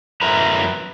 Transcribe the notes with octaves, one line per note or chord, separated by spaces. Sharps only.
F#2 E4 B4 A#5